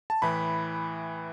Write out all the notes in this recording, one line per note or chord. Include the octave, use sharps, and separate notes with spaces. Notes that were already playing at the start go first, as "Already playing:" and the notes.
A5
A2 E3 B5